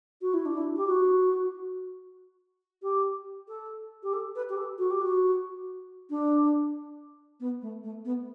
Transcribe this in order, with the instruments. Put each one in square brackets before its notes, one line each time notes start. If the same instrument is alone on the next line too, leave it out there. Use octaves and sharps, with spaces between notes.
[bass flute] F#4
E4
D4
E4
G4
F#4
G4
A4
G4
A4
B4
G4
A4
F#4
G4
F#4
D4
B3
A3
A3
B3